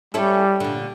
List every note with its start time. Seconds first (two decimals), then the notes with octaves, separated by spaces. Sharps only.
0.14 G3 C#4 E4 A4
0.60 A#2 D3